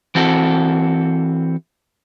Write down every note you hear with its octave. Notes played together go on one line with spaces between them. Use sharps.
E3 C4 F#4 A4